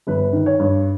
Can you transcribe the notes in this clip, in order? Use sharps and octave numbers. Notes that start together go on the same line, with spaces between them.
G1 B4
D#3
C#5
G2